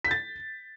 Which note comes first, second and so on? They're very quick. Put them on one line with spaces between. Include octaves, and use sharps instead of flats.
B6 G6 A6